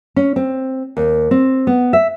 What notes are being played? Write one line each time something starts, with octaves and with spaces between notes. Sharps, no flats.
C#4
C4
D#2
C4
B3
E5